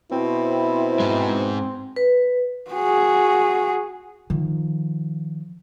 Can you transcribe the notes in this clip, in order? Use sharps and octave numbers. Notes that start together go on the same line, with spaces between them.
B2 C4 E4
G#2 G#3
B4
F#4 G#4
D#3 F3